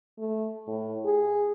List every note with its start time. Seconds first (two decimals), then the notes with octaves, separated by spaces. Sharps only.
0.18 A3
0.67 A2
1.05 G#4